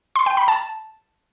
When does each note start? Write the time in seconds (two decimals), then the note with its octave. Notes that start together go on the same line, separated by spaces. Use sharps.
0.16 C6
0.26 G5
0.37 B5
0.48 A5